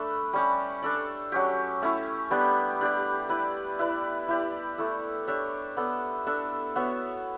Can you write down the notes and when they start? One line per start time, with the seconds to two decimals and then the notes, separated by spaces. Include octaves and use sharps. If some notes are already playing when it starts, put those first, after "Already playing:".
Already playing: A3 D4 A4 B4
0.33 G3 C#4 G4
0.82 D4 A4 D5
1.32 F#3 C#4 G4
1.82 A3 C#4 E4
2.31 G3 B3 D4 G4
2.81 D4 G4 D5
3.29 E4 B4 D5
3.79 E4 B4 D5
4.28 E4 G4 D5
4.78 A3 E4 A4
5.27 D4 G4 C#5 E5
5.77 B3 D4 A4
6.26 D4 A4 E5
6.76 B3 F#4 C#5 E5